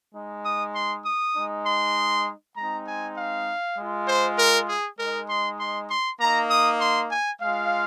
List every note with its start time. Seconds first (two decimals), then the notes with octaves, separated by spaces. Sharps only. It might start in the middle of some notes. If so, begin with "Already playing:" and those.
0.14 G#3 D#4
0.45 D#6
0.75 C6
1.06 D#6
1.35 G#3 D#4
1.66 C6
2.57 G#3 C4 D#4 A#5
2.88 G#5
3.17 F5
3.78 G#3 F4
4.08 C5
4.39 A#4
4.69 G#4
4.99 G#3 D#4 A#4
5.29 C6
5.60 C6
5.90 C6
6.20 A#3 D#4 A#5
6.51 D#6
6.81 C6
7.11 G#5
7.41 G#3 F4 F5